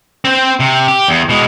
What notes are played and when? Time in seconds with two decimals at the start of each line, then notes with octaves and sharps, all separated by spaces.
0.25 C4 C5
0.60 C3
0.88 G4
1.08 E2
1.29 B2 G#3